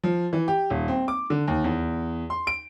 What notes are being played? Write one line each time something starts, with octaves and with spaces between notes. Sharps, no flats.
F3
E3
G4
D#1
C4
D6
D3
D#2
E2
C6
D7